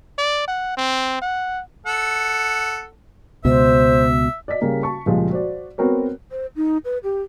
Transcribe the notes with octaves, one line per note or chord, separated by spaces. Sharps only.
D5
F#5
C4
F#5
A4 F#5
C#2 B2 C5 E5
D5 D#5 B6
C#3 G3 A#3
A5 C#6
C#2 A#2 F3 G3 G#3
F#4 C5 D5
B3 C4 F#4 A#4 C#5
C5
D#4
B4
G4